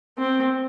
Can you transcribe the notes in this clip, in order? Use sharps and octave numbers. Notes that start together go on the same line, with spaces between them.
C4